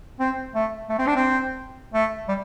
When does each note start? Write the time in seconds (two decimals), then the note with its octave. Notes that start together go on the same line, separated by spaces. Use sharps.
0.20 C4
0.55 A3
0.90 A3
0.99 C4
1.07 D4
1.16 C4
1.94 A3
2.29 G3